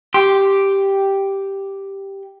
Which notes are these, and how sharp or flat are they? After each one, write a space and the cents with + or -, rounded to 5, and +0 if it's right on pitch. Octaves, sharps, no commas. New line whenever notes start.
G4 +0 C6 +0